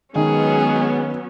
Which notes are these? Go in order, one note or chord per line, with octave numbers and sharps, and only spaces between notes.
D#3 F#3 G#3 B3 C#4 G#4